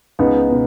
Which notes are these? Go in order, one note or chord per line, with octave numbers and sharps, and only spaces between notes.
C#2 B3 D#4
B2